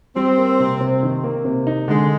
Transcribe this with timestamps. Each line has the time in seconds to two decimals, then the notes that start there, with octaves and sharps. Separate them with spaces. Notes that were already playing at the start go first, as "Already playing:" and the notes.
0.16 G3 C4
0.38 A#3
0.60 C3
0.81 C3
1.03 D#3
1.24 A#3
1.45 C3
1.67 D#4
1.88 D3 G#3